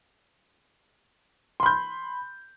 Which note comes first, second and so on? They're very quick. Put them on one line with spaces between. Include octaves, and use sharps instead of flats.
C6 B5 G6